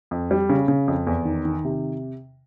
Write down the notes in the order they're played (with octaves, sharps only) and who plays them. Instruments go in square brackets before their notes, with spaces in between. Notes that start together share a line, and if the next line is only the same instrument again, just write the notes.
[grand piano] F2
G3
C#3
C#3
F2
E2
D#3
D#3
C3